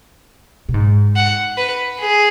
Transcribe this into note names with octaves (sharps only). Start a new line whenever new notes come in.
B2
G#2
F#5
B4
G#4